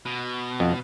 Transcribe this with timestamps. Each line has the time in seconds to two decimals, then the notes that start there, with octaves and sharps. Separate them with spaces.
0.06 B2
0.60 F2